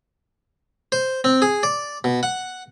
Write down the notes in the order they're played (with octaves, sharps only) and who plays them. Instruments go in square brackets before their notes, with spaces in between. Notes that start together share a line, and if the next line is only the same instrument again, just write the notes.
[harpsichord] C5
C4
G#4
D5
B2
F#5